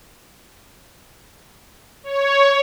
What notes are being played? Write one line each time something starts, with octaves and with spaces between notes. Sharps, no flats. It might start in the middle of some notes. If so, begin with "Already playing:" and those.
C#5